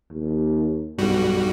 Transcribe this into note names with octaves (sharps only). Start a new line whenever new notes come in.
D#2
B1 G2 G3 F#4